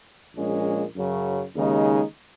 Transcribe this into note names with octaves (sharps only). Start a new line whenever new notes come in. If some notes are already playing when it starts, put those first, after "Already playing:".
A#1 A#2 G#3 C#4
F#2 C#3 F#3
D#2 C#3 G#3 D#4